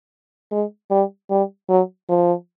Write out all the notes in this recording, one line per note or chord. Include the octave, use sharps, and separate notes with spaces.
G#3
G3
G3
F#3
F3